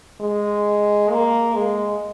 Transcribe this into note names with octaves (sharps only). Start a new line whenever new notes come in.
G#3
A#3
G#3